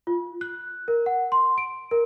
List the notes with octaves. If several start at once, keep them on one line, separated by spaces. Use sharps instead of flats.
F4
F#6
A#4
F#5
C6
D7
A#4